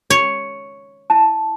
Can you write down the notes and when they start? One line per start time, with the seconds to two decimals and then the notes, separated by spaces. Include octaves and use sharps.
0.10 C#5
1.10 E4 A5